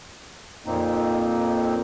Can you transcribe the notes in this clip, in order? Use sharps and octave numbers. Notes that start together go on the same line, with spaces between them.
F2 A#2 A#3 C4 D#4